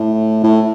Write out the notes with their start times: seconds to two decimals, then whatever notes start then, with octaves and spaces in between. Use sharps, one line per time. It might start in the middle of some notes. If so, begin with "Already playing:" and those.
Already playing: A2
0.43 A2